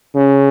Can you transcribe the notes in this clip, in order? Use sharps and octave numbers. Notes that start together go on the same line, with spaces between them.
C#3